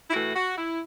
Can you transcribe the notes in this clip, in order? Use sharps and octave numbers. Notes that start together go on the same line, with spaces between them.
E4
A2 E3 A3 F#4
F#4
E4